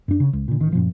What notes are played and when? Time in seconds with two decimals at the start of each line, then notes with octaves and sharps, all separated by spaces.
0.08 F#2 D4
0.20 C#3
0.33 C#2
0.48 A#2 D3
0.60 A1 D#3
0.73 F#2 A#2 F3